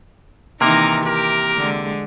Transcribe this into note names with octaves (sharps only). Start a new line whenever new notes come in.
C3 D#3 E3 A#3 D#4 A#4
G4 A#4
D3 G#3